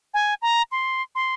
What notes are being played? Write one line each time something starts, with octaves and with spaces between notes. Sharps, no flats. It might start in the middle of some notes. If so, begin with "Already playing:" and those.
G#5
A#5
C6
C6